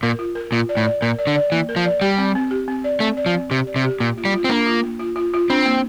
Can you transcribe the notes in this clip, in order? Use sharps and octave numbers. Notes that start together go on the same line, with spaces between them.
A#2 A#4
F4
A#4
A#2 F4
D5
A2
D5
A#2 A#4
D5
D3
D5
E3 A#3
A#4
F3
D5
G3 G4
C4
C4
G4
C4
D5
A3 C4
D5
F3
C4
C3 G4
D5
C3
G4
A#2 A#3
F4
G3
F4
C4
A#3 D4
F4
A#3
F4
F4
F4
C4 D4
A#3